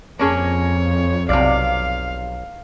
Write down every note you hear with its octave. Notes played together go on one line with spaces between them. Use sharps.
F2 A#3 C#4 G#4 C#5
B1 C3 D5 F5